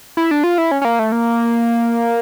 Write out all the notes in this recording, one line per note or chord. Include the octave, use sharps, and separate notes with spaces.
E4
D4
F4
E4
C#4
C#4
A#3
A3
A#3